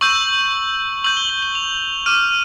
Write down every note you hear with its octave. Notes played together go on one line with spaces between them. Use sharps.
C#6 E6 G6 F#7
C#6 E6 G6 F#7
G7
F#7
F#7
F7
D6 F6 D#7